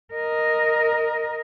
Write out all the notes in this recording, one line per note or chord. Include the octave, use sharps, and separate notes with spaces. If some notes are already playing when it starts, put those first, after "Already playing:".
A#4 D#5